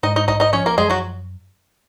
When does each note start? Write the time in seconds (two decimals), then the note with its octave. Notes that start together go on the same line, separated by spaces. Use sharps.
0.03 G#2 D#4 D#5
0.16 D#4 D#5
0.28 A#1 D#4 D#5
0.40 D#4 D#5
0.53 F3 C#4 C#5
0.66 A#3 A#4
0.78 F#2 G#3 G#4
0.90 F#3 F#4